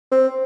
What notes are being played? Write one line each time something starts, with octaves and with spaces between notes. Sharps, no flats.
C4